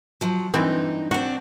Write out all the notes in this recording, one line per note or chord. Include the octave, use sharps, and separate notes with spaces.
F3 F#3
G2 E3 C4 D#4
C4 D4 F#4